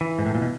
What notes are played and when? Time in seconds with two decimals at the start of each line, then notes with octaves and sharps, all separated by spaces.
0.01 E3
0.19 G#2
0.26 A2
0.35 A#2
0.42 B2